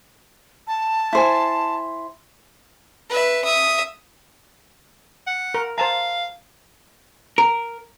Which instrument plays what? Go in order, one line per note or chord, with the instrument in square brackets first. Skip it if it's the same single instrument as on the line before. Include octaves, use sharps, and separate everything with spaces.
[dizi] A5
[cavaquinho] E4 C5 G#5
[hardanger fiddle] B4 E5
E5 D#6
[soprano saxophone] F#5
[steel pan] A#4
[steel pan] C5 A5 A#5 [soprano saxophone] F5
[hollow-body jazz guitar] A#4